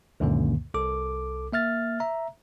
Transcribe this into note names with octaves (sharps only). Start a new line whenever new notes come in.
C#2 F#2 A#2 D3 D#3 A#3
C2 A4 D6
A#3 E5 F6 A6
E5 A#5